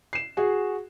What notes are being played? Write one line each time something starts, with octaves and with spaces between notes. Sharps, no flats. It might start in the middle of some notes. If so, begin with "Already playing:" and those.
C7 E7
F#4 G#4